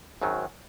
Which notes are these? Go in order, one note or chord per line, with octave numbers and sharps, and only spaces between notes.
G#1 F#2 D#3 F#3